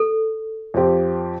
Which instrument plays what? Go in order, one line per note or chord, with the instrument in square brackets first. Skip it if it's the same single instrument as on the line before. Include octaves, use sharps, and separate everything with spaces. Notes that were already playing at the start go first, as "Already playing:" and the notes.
Already playing: [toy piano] A4
[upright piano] F2 F3 C4 G4